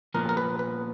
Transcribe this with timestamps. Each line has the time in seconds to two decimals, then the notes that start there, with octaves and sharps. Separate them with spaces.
0.14 A#2 F3 B3 A#4
0.29 A#4
0.37 B4
0.59 B4